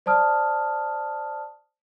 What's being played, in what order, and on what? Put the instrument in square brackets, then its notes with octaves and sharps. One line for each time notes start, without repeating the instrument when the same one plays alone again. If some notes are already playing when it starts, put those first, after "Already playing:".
[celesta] C5 D5 A5 D#6 F6